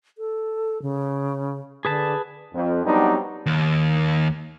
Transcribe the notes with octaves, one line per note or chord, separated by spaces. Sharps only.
A4
C#3
D3 G#4 B4 A5
F2
F#3 G3 B3 C4 D4 D#4
D#2